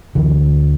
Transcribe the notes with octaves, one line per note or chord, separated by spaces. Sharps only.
D2 D3 E3